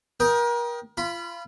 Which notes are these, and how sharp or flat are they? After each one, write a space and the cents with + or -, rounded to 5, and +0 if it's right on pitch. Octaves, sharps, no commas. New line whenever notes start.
A#4 +35 G5 +0 D#6 +0
F4 -30 B5 +0